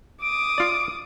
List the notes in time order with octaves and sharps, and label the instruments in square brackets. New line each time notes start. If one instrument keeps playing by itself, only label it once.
[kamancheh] D6 D#6 [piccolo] D7
[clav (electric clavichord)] F4 D5